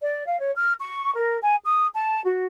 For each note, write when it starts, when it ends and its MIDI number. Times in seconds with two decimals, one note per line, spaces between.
0.01 0.26 74
0.27 0.39 77
0.40 0.52 73
0.56 0.73 89
0.80 1.13 85
1.16 1.38 70
1.42 1.56 80
1.64 1.87 87
1.95 2.19 81
2.24 2.44 66